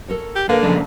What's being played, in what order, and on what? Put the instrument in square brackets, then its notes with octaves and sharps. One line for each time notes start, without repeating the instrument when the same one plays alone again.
[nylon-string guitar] A4 A#4 C#5
[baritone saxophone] G4
[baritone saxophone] D3 [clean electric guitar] A#3 [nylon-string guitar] B4 F5
[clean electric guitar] A#2 C#3 D4 [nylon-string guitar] F3 G#3